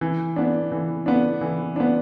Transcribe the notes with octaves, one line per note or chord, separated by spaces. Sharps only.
E3
B3 D4
E3
B3 D4
E3
B3 D4